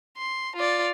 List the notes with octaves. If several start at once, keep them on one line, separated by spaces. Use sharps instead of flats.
C6
F4 D5